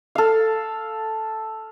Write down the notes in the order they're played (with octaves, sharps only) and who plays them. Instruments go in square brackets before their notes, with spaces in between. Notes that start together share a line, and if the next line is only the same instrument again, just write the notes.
[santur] A4 F5